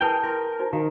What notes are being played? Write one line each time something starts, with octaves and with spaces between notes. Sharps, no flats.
E4 G#4 A#4 B4 G5 A5
E4 A#4 C6
D#4 F#4 C5
D#3 F#4 F5 A#5